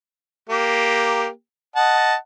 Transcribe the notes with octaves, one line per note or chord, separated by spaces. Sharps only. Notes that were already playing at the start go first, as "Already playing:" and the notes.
A#3 G4
D#5 F#5 A5